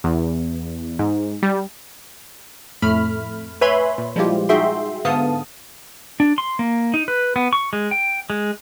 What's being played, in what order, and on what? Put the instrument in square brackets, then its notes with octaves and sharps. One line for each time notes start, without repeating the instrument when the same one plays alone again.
[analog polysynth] E2
G#2
G3
[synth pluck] F2 A2 A3 B5 F6 B6
B4 C#5 E5 G#5 B5 C6
A#2
F3 G3 G#3 E4 F4 G4
D#4 F#4 G#4 E5 G5 C6
G#2 D3 B3 F5 A5 D#6
[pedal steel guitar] D4
C6
A#3
D#4
B4
B3
C#6
G#3
G5
G#3